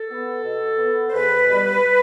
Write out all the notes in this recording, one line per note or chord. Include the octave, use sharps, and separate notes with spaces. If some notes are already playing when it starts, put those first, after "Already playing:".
Already playing: A4
B3
B2
B3
C5
E2 B4
B2 G3